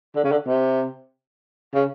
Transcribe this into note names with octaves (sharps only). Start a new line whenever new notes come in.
D3
C#3
D3
C3
C#3